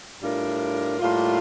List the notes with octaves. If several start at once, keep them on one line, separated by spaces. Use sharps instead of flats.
A2 G3 D4 F4 A#4
A2 G3 A#3 F4